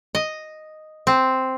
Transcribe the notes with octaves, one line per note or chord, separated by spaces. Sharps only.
D#5
C4